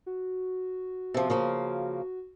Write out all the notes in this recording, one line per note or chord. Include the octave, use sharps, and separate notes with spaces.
F#4
C3 F3
C#3 F3 A#3